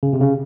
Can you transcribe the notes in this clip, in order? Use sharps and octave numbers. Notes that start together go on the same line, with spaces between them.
C#3
C3
C#3